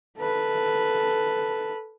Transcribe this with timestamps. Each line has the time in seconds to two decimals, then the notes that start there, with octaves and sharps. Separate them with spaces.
0.18 A4 B4